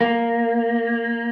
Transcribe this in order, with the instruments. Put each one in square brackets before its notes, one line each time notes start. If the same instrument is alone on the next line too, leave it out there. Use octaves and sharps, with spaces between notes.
[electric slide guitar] A#3